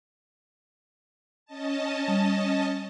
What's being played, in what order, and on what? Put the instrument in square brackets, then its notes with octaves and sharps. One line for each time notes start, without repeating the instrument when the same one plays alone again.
[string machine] C#4 D#5 A5
[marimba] G3